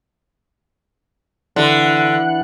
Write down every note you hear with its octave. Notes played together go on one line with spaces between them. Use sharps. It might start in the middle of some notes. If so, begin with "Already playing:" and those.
D3 E3 F#5